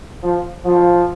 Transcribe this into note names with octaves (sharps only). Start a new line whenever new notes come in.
F3
F3